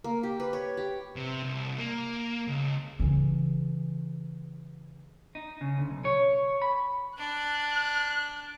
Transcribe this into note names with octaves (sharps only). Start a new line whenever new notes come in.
A#3
G4
B4
C#5
G4
C3
C2
A#3
C#2
C#3 E3
D#4
C#3
D2
B1
C#5
B5
D4 F#6